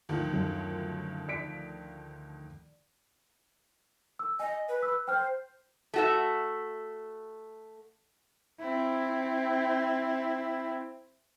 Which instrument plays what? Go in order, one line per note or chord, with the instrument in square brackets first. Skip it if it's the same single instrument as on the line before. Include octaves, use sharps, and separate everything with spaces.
[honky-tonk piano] D2 D#3 F3
[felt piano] F#2
D5 B6 D7
[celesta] E6
[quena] D#5 [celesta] G#5
[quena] B4
[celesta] E6
[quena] C5 [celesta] G5 F6
[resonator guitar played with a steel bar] A3 F#4 E5
[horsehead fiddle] C4 E4